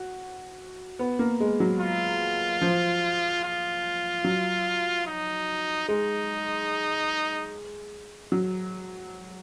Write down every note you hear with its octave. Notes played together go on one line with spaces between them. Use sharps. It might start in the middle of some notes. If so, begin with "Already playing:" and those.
Already playing: F#4
B3
A#3
G#3
F#3
F4
F3
F4
F#3
D#4
G#3 D#4
F#3